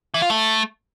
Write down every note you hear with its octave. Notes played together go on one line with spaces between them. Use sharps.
E3
F4
A3